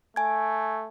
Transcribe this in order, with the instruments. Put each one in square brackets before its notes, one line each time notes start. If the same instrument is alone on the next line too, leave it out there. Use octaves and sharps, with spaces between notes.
[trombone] A3 [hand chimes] G#5 G#6